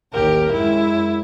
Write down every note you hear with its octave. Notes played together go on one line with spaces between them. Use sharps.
A1 D#2 G4 A#4
F#2 G#3 E4